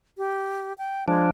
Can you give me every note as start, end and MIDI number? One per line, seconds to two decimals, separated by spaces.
0.17 0.73 67
0.78 1.07 79
1.08 1.30 53
1.08 1.26 56
1.08 1.30 62